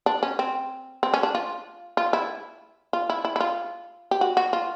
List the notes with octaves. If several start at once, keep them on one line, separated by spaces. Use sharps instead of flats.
D4
C#4
C4
C4
C#4
D4
F4
F4
E4
F4
E4
E4
E4
F4
G4
F#4
F#4
F4